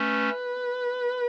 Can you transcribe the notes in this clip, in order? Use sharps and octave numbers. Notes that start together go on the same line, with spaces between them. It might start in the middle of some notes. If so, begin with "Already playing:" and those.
Already playing: A3 C#4 B4